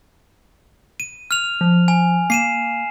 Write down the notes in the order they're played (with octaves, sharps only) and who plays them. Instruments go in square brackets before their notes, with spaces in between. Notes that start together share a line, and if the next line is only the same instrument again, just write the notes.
[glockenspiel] D#7
F6 F7
[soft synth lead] F3
[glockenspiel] G#5
[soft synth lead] A#3 [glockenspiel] C7 D#7 E7